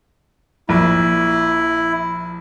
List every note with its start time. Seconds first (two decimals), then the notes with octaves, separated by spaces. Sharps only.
0.69 A#1 E4